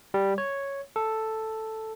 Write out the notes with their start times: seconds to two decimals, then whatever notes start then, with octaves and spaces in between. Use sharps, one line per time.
0.14 G3
0.38 C#5
0.96 A4